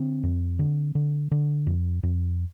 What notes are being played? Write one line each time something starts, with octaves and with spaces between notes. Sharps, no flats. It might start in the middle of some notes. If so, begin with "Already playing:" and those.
Already playing: D3 C4
F2
D3
D3
D3
F2
F2